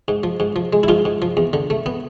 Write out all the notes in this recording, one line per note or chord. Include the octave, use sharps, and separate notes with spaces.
G#2
F3
G#2
F3
G#3
E4
G#2 F3 F4
G#2
F3
E2
D3
A3
B3